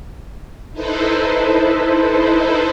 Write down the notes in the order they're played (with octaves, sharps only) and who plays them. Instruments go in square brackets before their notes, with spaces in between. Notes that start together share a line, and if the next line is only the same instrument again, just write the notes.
[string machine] D#4 E4 A4 B4 C5